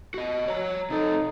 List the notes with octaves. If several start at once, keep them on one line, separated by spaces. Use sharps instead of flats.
F#4 D#5
C#5 A#5
C3 D#4 A4